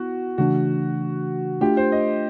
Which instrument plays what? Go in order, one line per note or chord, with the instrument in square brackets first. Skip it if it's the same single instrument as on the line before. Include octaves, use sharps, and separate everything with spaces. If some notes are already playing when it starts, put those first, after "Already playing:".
Already playing: [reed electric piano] B3 E4 [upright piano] F#4
[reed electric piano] C#3 E3 A3 D4 [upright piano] F#4
[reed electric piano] A3 D4 F4 [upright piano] G4
[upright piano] C5
D#5